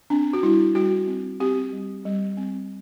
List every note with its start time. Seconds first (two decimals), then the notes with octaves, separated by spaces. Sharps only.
0.10 C4 D4
0.33 F#4
0.43 G3 E4
0.75 G3 F#4
1.07 C4
1.40 C4 G4
1.73 G3
2.05 G3
2.37 C4